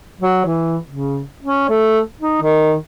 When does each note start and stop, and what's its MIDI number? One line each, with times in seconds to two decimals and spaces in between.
0.21 0.43 54
0.45 0.77 52
0.90 1.23 49
1.43 1.67 61
1.69 2.00 57
2.19 2.38 63
2.42 2.76 51